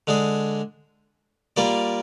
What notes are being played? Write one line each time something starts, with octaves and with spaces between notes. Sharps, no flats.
D3 G#3 D4 G#4
G3 A#3 F4 A#4 D5